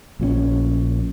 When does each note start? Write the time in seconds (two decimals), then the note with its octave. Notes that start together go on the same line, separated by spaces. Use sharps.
0.20 A#1 A#2 E3 C#4